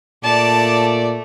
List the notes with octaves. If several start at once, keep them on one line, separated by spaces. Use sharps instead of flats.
A#2 A3 D5 A5